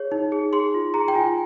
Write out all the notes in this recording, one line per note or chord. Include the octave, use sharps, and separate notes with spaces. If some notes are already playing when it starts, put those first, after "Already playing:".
Already playing: G#4 C#5
D#4
G#4
G#4 C6
F4
G#4 A#5
G5
F4 G#5